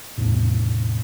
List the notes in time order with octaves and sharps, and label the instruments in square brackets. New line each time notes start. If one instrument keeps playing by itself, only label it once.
[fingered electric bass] E2 A2 C3